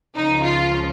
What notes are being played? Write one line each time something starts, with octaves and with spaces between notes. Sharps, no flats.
C#2 C#3 F3 D#4
F4